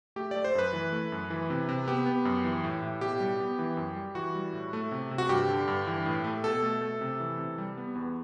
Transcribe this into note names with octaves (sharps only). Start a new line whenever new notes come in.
A3 G4
A3 D5
C5
F#2 B4
E3
A3
F#2
E3
C3
C3
B3 G4
B3
F#2
E3
A2
A2
B2 G4
G3
B3
E3
F#2
G3
E3 F#4
G3
A2
A3
C3
C3
F#4
G2 G4
D3
G2
E3
A2
A3
B2 A4
A3
A3
C3
E3
C3
G3
B3
E2